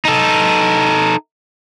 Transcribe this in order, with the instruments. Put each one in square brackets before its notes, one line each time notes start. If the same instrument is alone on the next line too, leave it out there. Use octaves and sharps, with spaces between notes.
[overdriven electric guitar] D#4 A4